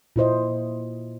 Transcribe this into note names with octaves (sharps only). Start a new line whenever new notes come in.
A#2 E4 C5 D#5